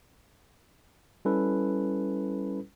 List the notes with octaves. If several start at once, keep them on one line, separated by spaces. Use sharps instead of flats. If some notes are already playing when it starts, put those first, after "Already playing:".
G3 C#4 E4 A4 B4